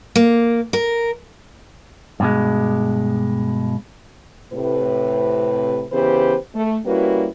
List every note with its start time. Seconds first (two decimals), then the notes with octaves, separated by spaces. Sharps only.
0.16 A#3
0.73 A#4
2.20 G2 B2 G#3
4.53 A2 C3 B4
5.92 C#3 E3 B3 G4 B4 C5
6.55 A3
6.86 G3 A#3 C#4 E4 F#4 B4